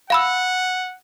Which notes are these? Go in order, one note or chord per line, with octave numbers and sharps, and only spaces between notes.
F5 F#5 B5 E6